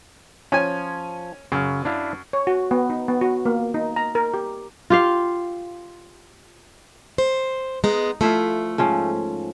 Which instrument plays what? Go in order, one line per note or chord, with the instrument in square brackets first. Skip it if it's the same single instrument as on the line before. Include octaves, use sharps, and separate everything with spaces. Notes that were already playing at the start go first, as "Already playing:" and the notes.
[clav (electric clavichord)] F3 [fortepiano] C#4 G#5
[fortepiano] F#2 [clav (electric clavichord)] C#3
[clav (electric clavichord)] D4 E4 F5
[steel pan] C#5
F#4
B3
D#4
B3
F#4
A#3
D#4
A#5
A#4
G4
[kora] F4 G4 F5
[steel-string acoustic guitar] C5
[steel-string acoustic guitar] G#3 B3 [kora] D#4
[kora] F3 E4 F4 [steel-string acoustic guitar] A3
[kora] G#2 F3 C#4